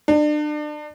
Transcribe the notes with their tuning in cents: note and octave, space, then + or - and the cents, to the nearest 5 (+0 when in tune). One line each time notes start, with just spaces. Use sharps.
D4 +35